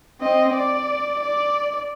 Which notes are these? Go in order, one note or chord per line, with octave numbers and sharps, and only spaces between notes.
C4 D#5
D5
D5